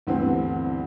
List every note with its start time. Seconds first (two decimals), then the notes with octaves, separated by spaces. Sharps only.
0.07 D2 G2 D3 E3 B3 C4